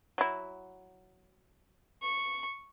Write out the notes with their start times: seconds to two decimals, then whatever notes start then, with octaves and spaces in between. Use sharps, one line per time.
0.18 F#3 E4
2.02 C#6